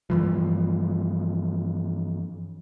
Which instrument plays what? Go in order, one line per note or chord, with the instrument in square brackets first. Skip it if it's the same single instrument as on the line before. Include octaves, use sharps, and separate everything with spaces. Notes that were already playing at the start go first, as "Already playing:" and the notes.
[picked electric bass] G2 E3 F3